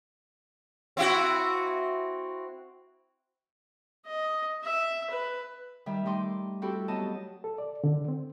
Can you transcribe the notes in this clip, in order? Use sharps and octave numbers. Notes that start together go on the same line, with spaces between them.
C4 E4 F#4
D#5
E5
B4
D#3 G3 E5
G3 A3 D#4 C6 D6
C4 E4 F#4 G4 A4
F#3 B3 D#5 A5
A4
D5
D3
C4